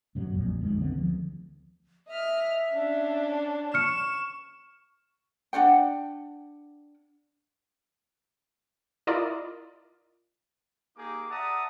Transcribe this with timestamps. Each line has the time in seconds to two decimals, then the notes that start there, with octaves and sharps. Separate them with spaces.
0.15 F#2 B2 F#3
0.34 A#1 F2 A#2 G3
0.60 B1 F2 D#3 G#3
0.79 D3 D#3 B3 C4
0.95 D2 F3
2.08 D#5 E5 F6
2.72 C#4 D4
3.74 C#6 F6 C#7 E7
5.53 D4 F4 F#5 G5
9.07 E4 F4 A#4 D5 D#5
10.97 A#3 D#4 G4 G#4 D6
11.30 D5 E5 F#5 A5 A#5 D#6